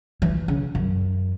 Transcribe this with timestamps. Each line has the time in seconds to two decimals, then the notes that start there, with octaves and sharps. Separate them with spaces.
0.22 E3
0.48 C#3
0.75 F#2